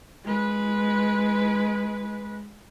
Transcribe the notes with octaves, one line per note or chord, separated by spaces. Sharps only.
G#3 B4